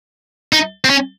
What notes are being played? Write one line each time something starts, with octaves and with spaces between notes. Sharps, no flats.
D#4
C4
C#4